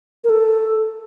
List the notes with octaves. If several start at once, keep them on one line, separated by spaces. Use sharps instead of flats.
A#4
A4